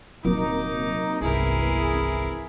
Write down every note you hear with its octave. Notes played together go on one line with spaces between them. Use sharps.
D#1 C3 F#3 A#3 C#4 D#4 D6
G1 C2 E3 E4 G#4 A#4
B3
G#1